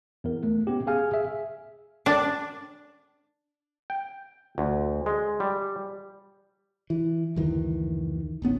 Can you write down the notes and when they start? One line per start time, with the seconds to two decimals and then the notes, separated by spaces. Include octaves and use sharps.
0.24 E2 A#4
0.43 A3
0.67 B3 C#4 G4
0.87 G#4 F5 G#5 F6
1.12 G#4 E5
2.06 D4
3.90 G5
4.58 D2
5.06 G#3
5.40 G3
6.90 E3
7.36 F#1 D2 D#3 E3
8.42 D1 G#1 B3 C#4